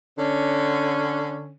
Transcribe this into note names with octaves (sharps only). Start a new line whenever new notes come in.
D3 C#4